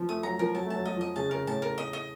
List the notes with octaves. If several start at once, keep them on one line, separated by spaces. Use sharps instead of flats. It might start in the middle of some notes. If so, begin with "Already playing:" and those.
Already playing: F3
A3 D#6
F#3 A#5
F3 A#4
F#3 A5
A3
F#3 A5
F#3 D#5
F3
D#5
C#3 A5
C#3 A#4
A2 A5
A#4
D#5
D#5